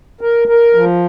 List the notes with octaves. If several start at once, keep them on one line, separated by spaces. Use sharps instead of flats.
A#4
A#4
F3